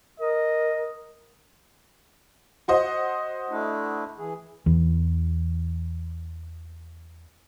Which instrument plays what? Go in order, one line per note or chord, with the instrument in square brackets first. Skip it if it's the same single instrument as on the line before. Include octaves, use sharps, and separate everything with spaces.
[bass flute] A#4 [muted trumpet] D#5
[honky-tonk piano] F#4 C5 D#5
[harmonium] A3 D4 E4
E3 G#4
[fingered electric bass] E2 E3